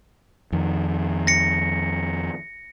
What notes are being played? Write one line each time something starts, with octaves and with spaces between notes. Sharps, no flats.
F2 D#3
A#6 C#7